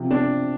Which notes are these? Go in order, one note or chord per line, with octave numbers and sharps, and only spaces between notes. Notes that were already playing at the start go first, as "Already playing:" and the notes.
Already playing: C3 F3
D4